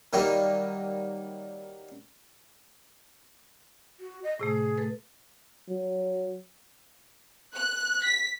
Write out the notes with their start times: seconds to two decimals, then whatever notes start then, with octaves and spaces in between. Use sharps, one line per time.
0.13 D#3 F#3 G3 A#3 D#4
4.00 F#4
4.24 D#5
4.39 A2 C3 A3 G#4
4.78 A3 A4 B4
5.69 F#3
7.56 F#6
8.04 B6